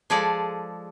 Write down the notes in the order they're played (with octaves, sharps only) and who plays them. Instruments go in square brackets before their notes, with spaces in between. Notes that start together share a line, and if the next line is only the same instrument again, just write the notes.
[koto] F3 G#3 G#4 A4 D5